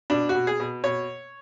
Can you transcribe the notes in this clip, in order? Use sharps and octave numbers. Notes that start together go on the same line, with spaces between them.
B2 D4
F#4
B2
G#4
B2
B2 C#5